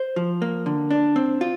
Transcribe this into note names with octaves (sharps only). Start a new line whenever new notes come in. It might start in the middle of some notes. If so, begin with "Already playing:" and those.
Already playing: C5
F3
A#3
D3
D4
C4
F4